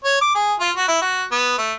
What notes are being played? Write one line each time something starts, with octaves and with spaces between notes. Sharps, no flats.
C#5
D6
G#4
F4
F#4
E4
F#4
B3
A3